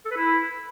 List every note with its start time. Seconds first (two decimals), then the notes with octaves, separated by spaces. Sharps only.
0.05 A4
0.11 B4
0.16 E4